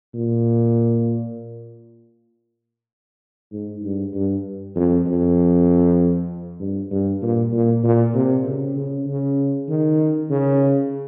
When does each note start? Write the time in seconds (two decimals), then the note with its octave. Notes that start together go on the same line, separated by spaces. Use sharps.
0.14 A#2
3.52 G#2
3.83 G2
4.14 G2
4.76 F2
5.06 F2
6.60 G2
6.91 G2
7.22 A#2
7.52 A#2
7.84 A#2
8.14 C3
8.45 C#3
8.76 C#3
9.07 C#3
9.68 D#3
10.30 C#3